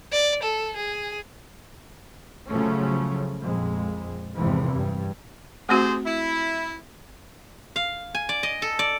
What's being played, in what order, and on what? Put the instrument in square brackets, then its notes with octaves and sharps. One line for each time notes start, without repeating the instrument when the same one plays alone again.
[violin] D5
A4
G#4
[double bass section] C#3 F3 F#3 A3 C#4
A#1 F2 G#3
G#1 E2 G#2 C3 E3 F3
G2
[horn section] C3 G#4 C5 [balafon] A3 C4 F#4
[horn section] E4
[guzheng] F5
G#5
D5
D#5
A4
D5